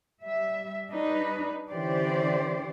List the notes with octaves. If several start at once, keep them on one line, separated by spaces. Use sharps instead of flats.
G3 E5
G3 D4 D#4 B4
D3 E3 C#4 G4 C5 D5